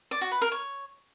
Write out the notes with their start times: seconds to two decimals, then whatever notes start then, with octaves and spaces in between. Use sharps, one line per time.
0.11 D5
0.21 F#4
0.31 B4
0.41 A#4
0.52 C#5